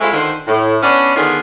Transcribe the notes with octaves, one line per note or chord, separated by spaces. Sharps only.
G#3 A3 C4 E4 F4
D3 D#3 C5
A2
B3 C#4 D4
D3 D#3 B3 F4 G#4